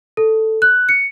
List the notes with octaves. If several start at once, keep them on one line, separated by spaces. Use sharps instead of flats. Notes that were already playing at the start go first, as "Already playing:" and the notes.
A4
F#6
C#7